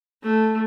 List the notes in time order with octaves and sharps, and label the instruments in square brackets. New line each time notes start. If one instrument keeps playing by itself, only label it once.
[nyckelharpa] A3